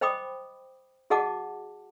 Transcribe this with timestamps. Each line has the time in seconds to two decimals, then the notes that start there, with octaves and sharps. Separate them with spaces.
0.01 C5 D#5 G5 B5 D6 D#6
1.10 F#4 G#4 D#5 F#5 A5 D6